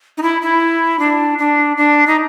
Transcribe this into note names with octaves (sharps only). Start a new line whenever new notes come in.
D#4
E4
E4
D4
D4
D4
D#4